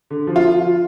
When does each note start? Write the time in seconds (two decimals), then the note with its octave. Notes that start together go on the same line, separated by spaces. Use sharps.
0.10 D3
0.27 F3
0.36 F4